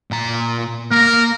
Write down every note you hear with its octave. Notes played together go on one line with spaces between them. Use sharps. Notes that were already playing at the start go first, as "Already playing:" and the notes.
A#2 A#5
A#3 A#4